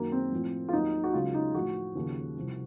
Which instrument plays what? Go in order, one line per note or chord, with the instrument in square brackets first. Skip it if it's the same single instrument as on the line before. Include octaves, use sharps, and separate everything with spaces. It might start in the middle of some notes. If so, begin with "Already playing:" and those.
Already playing: [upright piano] F#2 D#3 F#3 A#3
C4
A2 F3
F4
D#2 D#3 F#3 D#4
F#4
C#2 C#3 F#3 F4
D#4
A2 F3 F#4
D#2 C#3 F3
C2 C3 F3